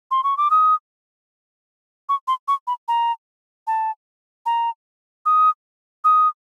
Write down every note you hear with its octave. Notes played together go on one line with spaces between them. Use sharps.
C6
C#6
D6
D#6
C#6
C6
C#6
B5
A#5
A5
A#5
D#6
D#6